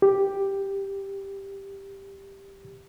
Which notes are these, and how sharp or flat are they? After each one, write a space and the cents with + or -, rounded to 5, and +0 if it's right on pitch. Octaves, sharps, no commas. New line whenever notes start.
G4 +5